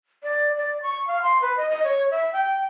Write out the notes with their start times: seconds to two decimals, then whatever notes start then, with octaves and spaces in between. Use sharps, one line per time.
0.23 D5
0.57 D5
0.82 C#6
1.07 F5
1.22 C6
1.42 B4
1.57 D#5
1.70 D#5
1.84 C#5
2.11 E5
2.33 G5